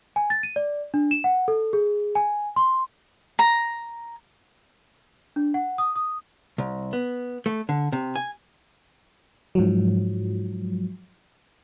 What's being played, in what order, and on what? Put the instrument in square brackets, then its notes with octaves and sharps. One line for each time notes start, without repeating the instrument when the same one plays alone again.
[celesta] G#5
A6
D#7
D5
D4
E7
F#5
A4
G#4
G#5
C6
[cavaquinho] A#5
[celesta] D4
F#5
D#6
D#6
[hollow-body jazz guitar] C2
B3
A3
D3
C3
G#5
[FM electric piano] G#2 F3 F#3